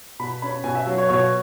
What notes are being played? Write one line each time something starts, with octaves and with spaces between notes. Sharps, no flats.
B2 B5
C#4 B5
B2 G#5
E5
F#3
C#5
B2 C#5